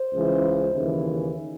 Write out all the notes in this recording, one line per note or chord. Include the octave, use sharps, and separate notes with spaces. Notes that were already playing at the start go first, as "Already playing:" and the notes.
Already playing: C5
C#2 C#3 E3
D#2 C#3 E3